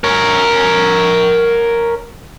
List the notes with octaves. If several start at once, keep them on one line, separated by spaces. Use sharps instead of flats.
A#4 C#5